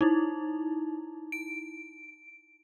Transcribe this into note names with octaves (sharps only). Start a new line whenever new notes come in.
D#4 E4
D7